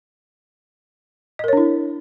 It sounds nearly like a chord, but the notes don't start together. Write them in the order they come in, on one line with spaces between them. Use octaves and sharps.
D#5 A#4 C#5 D4 E4